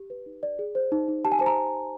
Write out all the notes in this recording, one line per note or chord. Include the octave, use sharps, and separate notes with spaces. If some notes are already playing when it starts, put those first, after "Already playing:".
Already playing: G4
B4
D#4
D5
G#4
C5
D#4
D#4
G4 A5
G#5
C5 A5
A#5